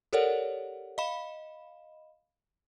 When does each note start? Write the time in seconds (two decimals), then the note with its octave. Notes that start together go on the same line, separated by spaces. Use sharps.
0.13 G4 A4 A#4 C#5 D5 F#5
0.98 D#5 F5 B5 E7